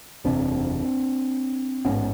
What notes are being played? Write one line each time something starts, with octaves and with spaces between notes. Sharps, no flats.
F#1 E2 C3 C4 D4
A1 G#2 B3 C#4